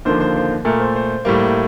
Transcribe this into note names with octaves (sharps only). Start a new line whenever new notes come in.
D#2 D3 F3 A#3 C5
C5
C5
A#2 A3 A#4
C5
C5
A2 G3 A#3